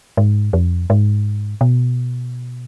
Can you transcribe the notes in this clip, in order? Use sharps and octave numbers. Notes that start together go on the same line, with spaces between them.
G#2
F2
G#2
B2